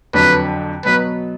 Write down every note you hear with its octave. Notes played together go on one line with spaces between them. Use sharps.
F2 D3 F#3 B4
B2 F#3 B3 B4